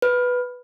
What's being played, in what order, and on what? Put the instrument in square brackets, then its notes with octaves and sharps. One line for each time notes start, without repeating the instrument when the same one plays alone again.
[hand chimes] B4